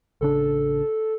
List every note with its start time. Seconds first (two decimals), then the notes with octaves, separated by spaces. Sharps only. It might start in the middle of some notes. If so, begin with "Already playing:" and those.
0.21 A1 C#3 D4 A4